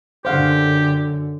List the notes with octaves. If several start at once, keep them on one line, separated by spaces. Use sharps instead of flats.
F#2 D3 G4 C5 F5 F#5